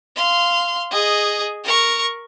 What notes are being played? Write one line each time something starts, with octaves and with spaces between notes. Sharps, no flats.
F5 C6
G#4 D#5
A#4 C#6